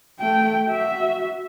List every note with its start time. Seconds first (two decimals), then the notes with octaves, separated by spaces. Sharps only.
0.20 A3 G5
0.67 F#4 E5